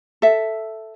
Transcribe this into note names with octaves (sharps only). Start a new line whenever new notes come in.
A4 E5